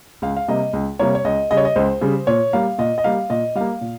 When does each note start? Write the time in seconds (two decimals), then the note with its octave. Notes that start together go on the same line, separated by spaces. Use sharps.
0.22 C#2 F5
0.37 F5
0.48 C3 G3 A#3 D#5
0.73 C#2
0.99 C3 G3 A#3 C#5
1.15 C#5
1.25 C#2 D#5
1.51 C#3 G3 D#5
1.57 C#5
1.65 D#5
1.76 C#2 C5
2.01 C#3 G3
2.27 A#2 C#5
2.53 G3 A#3 F5
2.78 A#2 D#5
2.98 D#5
3.04 G3 A#3 F5
3.30 A#2 D#5
3.55 G3 A#3 F5
3.81 A#2